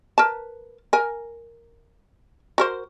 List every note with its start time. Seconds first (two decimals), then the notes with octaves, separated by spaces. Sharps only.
0.18 A#4 B4 A5
0.93 A#4 G#5
2.58 F#4 A#4 C5